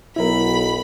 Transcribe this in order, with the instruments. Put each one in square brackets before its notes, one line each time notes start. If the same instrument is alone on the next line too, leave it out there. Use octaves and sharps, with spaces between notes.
[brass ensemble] B1 [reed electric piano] E4 A#4 [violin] B5